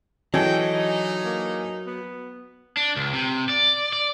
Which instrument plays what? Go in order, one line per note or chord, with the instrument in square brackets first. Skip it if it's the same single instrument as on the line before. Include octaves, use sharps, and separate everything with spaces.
[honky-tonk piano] E3 G#4 A4 [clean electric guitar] F#3 [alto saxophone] D#5 [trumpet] G5
[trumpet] D#4
[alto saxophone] A#3
B3
[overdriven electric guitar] D4
C#2
C3
D5
D5